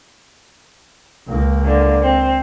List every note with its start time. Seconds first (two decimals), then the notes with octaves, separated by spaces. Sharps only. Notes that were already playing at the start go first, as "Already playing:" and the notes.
1.28 C#2 A#3
1.65 D3
2.03 C4